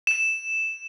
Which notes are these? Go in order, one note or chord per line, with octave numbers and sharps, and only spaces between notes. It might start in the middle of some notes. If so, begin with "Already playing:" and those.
E7